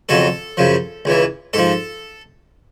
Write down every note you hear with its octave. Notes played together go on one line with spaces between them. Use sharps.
F2 C#3 F#3 A4
F#2 C#3 F3
C#2 C#3 E3
G#2 F3 A4